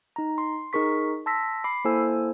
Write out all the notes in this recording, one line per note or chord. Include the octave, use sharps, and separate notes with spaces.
D#4 A#5
C6
D#4 G#4 A#4 C#6 B6
A5 C6 E6 A#6 B6
B5 D6 C7
A#3 E4 A4 C5 G#5 E6